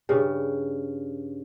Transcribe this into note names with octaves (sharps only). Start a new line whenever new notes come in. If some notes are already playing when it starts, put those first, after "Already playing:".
G2 C#3